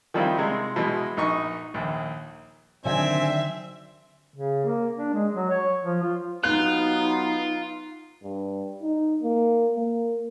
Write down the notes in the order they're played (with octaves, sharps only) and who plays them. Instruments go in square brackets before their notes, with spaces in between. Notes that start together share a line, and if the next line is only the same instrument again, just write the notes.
[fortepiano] D#3 F3 G3 C4 E4 F4
C3 G#3
B2 E3 G#3
A#1 D#4 C#6
A#1 D#2
[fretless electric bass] D3 D#3 F#3 [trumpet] C4 [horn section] D4 G#5 [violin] E5
[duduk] C#3
A#3
D4
G#3
F#3
C#5
F3
F4
[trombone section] F#3 B3 [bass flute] D#4 [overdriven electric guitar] F4 [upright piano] F#6
[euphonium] G2
D#4
A#3
A#3